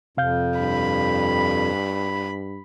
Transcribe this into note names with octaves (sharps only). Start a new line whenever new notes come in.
F2 C3 F5 G6
G2 B5